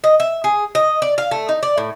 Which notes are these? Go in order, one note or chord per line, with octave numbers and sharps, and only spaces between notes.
D#5
E5
G#4
D#5
D5
F5
A3
D#4
D5
A2